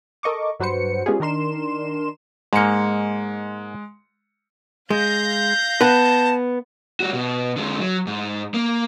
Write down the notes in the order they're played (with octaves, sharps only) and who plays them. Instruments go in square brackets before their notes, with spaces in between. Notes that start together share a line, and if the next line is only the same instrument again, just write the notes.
[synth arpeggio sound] A4 A#4 D#5 C#6 D6
G2 F#3 F#4 B4 C5 C#7
G#3 B3 C#4 F4 G4 G#4
D#3 D4 A#4 C6 E7
[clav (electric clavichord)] G#2 A#3 [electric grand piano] G#3 C#7
[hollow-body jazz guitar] G#3 [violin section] F5 G6 A#6
[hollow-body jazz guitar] B3 B4 [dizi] A5
[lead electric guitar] G3 F#4
B2
D3 G#3
F#3
G#2
A#3